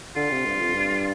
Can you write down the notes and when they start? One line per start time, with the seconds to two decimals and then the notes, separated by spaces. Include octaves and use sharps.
0.16 D3 F4
0.31 C3
0.46 G2
0.61 F2
0.75 G2